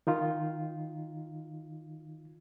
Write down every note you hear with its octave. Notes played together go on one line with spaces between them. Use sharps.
D#3 D#4 F4